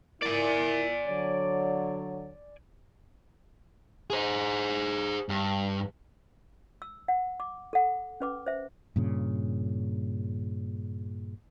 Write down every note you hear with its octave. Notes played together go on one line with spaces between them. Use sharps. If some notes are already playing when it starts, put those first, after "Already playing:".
E4 A#4 D5 G#5
D3 F#3 C#5
G#4 C5
G2
E6
F#5
D6
A4 F#5
C#4 B4 D6
C5 E5
G2 A#2 C#3